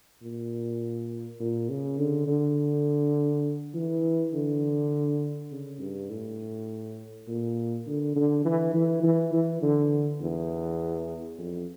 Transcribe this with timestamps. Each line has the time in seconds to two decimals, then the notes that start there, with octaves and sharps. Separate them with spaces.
0.22 A#2
1.40 A#2
1.69 C#3
1.99 D3
2.27 D3
3.74 E3
4.34 D3
5.52 C#3
5.81 G2
6.10 A2
7.28 A#2
7.87 D3
8.16 D3
8.45 E3
8.74 E3
9.03 E3
9.33 E3
9.62 D3
10.21 E2
11.39 F2